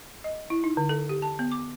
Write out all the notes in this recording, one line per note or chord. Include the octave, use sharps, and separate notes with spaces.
D#5
E4
D#4
D3
A4
G4
A5
B3
D6